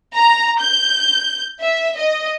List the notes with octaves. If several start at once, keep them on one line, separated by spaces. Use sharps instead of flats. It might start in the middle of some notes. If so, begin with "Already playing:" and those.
A#5
G6
E5
D#5